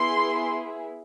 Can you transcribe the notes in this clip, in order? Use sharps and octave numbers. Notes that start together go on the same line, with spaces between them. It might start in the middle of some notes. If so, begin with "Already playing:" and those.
Already playing: B3 E4 G#4 C6